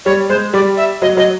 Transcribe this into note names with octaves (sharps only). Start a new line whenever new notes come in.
G3 C#5
G#3 C5
G3 D5
E5
F#3 D#5
F#3 D#5